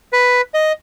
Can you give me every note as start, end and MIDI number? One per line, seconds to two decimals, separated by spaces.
0.13 0.41 71
0.54 0.72 75